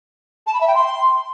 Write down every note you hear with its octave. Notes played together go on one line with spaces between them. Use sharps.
A5
B5
E5
G5
C6